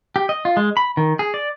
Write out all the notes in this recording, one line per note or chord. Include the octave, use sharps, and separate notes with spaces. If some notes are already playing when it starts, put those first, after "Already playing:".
G4
D#5
F4
G#3
B5
D#3
G#4
D5